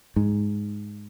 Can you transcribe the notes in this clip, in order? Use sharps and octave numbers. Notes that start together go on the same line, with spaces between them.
G#2